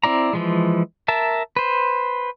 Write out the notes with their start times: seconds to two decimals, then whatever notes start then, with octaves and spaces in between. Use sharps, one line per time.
0.03 C4 E4 D5 A#5
0.33 E3 F3 G#3
1.08 A#4 E5 A5
1.56 B4 C5